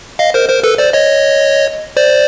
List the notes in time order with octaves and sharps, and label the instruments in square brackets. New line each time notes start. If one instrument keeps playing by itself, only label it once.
[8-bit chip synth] D#5 F5
A#4 C5
A#4 C5
A4 B4
C5 D5
C#5 D#5
C5 D5